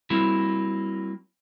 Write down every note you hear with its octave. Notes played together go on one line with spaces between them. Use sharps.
F#3 G3 A#3 C4 E4